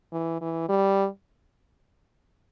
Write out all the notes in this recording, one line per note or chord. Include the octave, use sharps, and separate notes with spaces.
E3
E3
G3